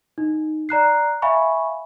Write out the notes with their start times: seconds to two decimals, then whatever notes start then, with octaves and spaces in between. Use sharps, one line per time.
0.18 D#4
0.69 D5 A#5 F#6 C7
1.22 E5 F5 G#5 B5 C#6